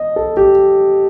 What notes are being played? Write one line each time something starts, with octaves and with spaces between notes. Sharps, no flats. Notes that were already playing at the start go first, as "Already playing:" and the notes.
Already playing: D#5
A4
G4